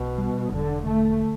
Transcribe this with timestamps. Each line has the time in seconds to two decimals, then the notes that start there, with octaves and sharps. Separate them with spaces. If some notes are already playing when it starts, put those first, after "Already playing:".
Already playing: B1 B2
0.18 G3
0.52 E1 D3
0.85 D3 A3